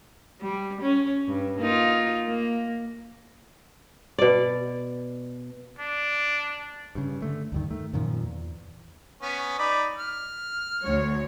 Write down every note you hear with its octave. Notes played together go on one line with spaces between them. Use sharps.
G3
C#4
G2
A#3 D#4 F4
A#3
B2 D5
D4
G2 C#3
D3 A3
D2 G2 D#3
D#3 A3
F#2 A#2 D#3 F3
E2
B3 C#4
D#4 D5 B5
F6
D2 C#5